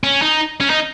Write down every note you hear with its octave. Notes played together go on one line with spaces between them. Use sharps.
C#4
D#4
C#4
D#4